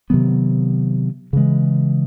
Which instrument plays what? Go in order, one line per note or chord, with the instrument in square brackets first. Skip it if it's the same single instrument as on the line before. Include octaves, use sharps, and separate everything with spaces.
[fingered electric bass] C3 D#3 F#3 B3
C#3 E3 G#3